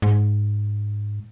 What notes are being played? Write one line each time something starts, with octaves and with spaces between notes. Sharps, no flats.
G#2